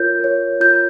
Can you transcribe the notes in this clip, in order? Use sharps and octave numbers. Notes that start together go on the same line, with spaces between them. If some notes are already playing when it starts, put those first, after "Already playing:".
Already playing: F4 A#4 C#5 G6
A#4 C#5
F4 G6